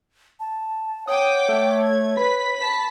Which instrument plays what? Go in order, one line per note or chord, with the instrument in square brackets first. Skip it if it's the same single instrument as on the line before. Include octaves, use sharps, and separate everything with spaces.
[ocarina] A5
[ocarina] C#5 [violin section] F#5 G5 D6 [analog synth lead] D#6
[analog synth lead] A3
[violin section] G#6
[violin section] B4 B6 [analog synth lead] B5
[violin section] A5 B6